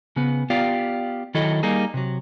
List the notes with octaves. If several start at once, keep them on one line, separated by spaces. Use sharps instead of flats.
C#3 B3
B3 F4 G4 D5 F5
D#3 F#3 E4 A4 D#5
G3 A#3 D#4 G#4
C3 F#3